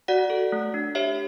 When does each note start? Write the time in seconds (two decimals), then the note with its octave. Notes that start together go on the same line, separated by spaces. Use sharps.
0.08 F#4 D5 F#5
0.30 A4
0.52 A3
0.74 D4
0.95 G4 C#5 E5